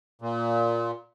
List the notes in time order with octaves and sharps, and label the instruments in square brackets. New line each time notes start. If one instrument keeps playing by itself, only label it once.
[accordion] A#2